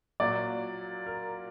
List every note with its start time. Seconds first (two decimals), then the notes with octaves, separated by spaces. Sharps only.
0.20 A#2 F#3 D5
1.06 A#4